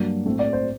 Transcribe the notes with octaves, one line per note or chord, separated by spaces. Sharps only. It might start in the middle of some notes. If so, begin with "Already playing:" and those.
Already playing: G2 F#3 A#3 D4
A2 A3 C4
D5
C5